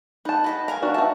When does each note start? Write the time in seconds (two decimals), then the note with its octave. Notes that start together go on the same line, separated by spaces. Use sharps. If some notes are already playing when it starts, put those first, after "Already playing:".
0.25 D#4 B4 A5
0.44 F#4 B4 D#5
0.68 A#4 F5 G#5 A#5
0.82 B3 D4 F#4
0.94 F#4 E5 A5